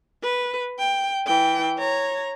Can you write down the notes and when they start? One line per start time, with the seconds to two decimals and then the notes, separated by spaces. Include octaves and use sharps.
0.23 B4
0.79 G5
1.27 E3 G5
1.78 C#5 A#5